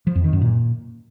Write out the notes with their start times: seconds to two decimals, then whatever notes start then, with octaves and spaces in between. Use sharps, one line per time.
0.07 F3
0.15 F2
0.24 D#3
0.33 F#2
0.41 A#2